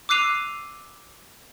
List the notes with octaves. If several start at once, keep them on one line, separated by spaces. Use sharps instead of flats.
D6 E6 F#6 C7 D#7 F7